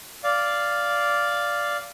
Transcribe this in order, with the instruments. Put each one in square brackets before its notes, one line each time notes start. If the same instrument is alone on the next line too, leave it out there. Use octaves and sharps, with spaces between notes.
[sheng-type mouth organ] D5 F5